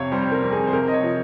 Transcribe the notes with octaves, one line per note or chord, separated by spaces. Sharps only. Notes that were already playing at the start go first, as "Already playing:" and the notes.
Already playing: F2 C3 C#5 F5
G3 C5
A#4
F2
G#4
C5
C3 A#4
D#5
C#5
F3